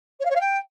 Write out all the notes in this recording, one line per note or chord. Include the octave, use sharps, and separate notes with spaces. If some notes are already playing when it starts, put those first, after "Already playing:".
C#5
F5
C#5
F5
G5